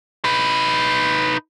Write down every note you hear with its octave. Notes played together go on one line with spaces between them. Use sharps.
D#4 B4